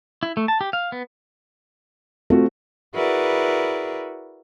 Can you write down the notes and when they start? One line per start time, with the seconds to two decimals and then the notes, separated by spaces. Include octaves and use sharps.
0.23 E4
0.37 A3
0.48 A5
0.61 G4
0.73 F5
0.92 B3
2.30 A3 C4 F4 F#4
2.94 E4 F#4 G#4 A#4 B4 D5